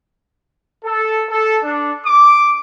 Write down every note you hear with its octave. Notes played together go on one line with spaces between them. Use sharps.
A4
A4
D4
D6